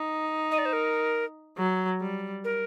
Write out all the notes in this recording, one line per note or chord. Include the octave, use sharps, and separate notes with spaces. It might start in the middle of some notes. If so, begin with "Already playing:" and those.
Already playing: D#4
D#5
D5
C5
A#4
F#3
G3
A#4